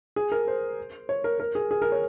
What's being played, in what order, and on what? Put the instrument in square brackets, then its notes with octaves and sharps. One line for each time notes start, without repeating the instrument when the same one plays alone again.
[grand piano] G#4
A#4
C5
C#5
A#4
A#4
G#4
G#4
A#4
C#5